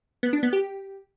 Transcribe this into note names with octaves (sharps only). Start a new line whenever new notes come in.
B3
D4
B3
G4